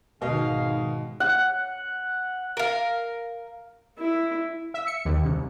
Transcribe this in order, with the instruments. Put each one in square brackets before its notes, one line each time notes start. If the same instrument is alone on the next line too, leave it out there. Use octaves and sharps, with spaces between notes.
[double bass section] G#1 D#3 G#3 [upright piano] B2 D#5 [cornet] F5
[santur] F#5
[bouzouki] A#4 F5
[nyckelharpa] E4
[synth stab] E5
C#7
D#2
C2